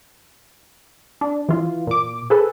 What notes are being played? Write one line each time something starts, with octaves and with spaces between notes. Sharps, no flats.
D4
E3 F4
A#2 D6
G#4 A4 B4